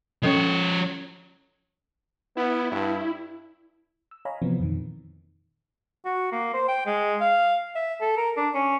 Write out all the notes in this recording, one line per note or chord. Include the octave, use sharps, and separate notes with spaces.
F3 C#4 A4 C#5 D#5
B3 E4
G2
E6
C#5 D#5 F5 G#5 A#5 B5
C3 E3 F3 B3 C4
F2 A#2 D#3
F#4
A#3
C5
G5
G#3
F5
E5
A4
A#4
D4
C#4